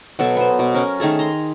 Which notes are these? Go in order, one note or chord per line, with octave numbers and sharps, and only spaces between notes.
B2 F#3 A4
B3 C5
B2
C#4 A#4
D#3 A3 G#4 A4
A#5 C6